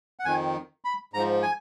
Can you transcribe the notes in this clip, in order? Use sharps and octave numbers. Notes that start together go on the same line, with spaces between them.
F#5
F2 D#3 G#5
B5
G#2 F3 A#5
G#5